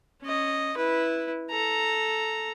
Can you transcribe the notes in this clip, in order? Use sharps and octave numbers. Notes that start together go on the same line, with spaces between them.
C#4 D#5
E4 B4
A4 A#5